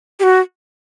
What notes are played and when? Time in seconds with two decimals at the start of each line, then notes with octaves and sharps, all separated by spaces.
0.20 G4
0.23 F#4